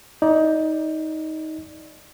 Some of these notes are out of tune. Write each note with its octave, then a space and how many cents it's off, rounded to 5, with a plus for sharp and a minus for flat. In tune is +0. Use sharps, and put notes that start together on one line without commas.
D#4 +20 D5 +0